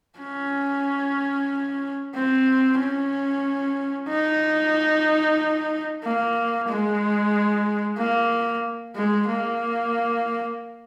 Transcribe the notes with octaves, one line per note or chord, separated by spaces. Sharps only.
C#4
C4
C#4
D#4
A#3
G#3
A#3
G#3
A#3